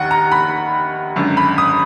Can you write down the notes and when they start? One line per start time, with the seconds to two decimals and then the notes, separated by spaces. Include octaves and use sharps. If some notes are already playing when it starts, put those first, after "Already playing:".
Already playing: F1 D#2 D#3 F#5
0.11 A#5
0.32 B5
1.16 G#1 F#2 D3
1.37 B5
1.58 D#6